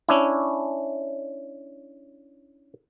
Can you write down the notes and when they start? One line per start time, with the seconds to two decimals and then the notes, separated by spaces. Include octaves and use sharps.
0.09 C#4 D4 E4